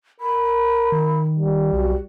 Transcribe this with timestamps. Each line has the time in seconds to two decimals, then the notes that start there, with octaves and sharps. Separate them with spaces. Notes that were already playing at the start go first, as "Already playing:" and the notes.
0.20 A#4 B5
0.92 D#3
1.39 G3
1.73 B1 F#4